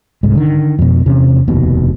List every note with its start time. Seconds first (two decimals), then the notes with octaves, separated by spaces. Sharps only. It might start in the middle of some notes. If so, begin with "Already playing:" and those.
0.23 C2 G#2
0.35 D3 D#3
0.79 F2 B2
1.06 E2 C3 C#4
1.48 F1 D#2 B2